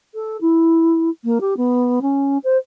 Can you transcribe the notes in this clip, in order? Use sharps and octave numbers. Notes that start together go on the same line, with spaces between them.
A4
E4
A#3
G4
B3
C#4
C5